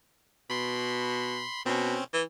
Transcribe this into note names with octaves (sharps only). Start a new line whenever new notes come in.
B2 B5 C6
B2 C4 C#4
E3